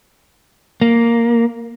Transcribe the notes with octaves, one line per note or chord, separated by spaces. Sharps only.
A#3